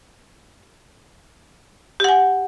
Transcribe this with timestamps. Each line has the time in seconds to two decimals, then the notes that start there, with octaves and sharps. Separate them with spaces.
2.00 G4
2.04 F#5
2.09 G#5